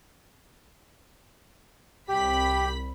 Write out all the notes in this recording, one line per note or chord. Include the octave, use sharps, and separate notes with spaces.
C2 G4 B5 B6